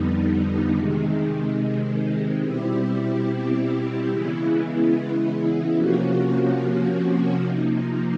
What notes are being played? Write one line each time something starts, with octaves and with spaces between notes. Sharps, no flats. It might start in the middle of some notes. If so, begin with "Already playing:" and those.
Already playing: F2 D3 G3 B3 D#4
C3 D#3 G#3
B2 G3 C4 E4 G4
C#3 E3 G#3 B3 E4
C3 F3 A#3 C#4 F#4
C3 F3 A#3 D#4